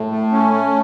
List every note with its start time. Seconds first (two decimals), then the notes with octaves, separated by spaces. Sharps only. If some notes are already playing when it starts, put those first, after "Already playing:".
Already playing: A2
0.11 A3
0.32 C#4
0.53 A3